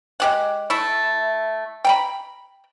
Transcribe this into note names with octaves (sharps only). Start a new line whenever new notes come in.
G#3 G4 F#5
A3 E4
G5 A#5 B5